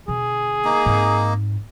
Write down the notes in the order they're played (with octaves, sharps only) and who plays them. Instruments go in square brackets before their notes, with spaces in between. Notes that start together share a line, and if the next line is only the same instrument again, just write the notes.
[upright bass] B2 D3 [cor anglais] G#4
[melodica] A#3 D#4
[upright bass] G#2 C4